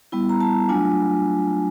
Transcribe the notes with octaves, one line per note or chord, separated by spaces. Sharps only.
G3 B3 E4
A#5
A5
F#3 A3 D4 F4 G#5